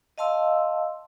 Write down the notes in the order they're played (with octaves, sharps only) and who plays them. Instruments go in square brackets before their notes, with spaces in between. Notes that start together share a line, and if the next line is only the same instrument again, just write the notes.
[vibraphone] D#5 F5 A5 C6 E6